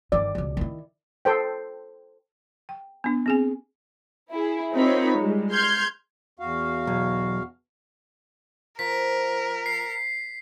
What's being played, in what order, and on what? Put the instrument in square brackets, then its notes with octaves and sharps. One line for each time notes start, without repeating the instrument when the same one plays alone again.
[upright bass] G1 D#3 [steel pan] D5
[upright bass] C#2 B2
D#3 E4
[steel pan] A4 C5 G5
[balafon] G5
B3 D4
C4 G#4 G#5
[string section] E4 G#4
C4 D#4 F4 A#4 C#5 B5
G3 G#3
C6 F6 G6 G#6
[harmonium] E2 F#4 F5
[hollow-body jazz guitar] B1
[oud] F3 [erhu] A#4 [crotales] B6
[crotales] C7